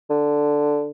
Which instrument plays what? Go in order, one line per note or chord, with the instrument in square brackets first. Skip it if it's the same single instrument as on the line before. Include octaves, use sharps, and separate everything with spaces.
[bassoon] D3